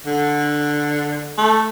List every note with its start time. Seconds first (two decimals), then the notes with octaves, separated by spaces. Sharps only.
0.06 D3
1.38 A3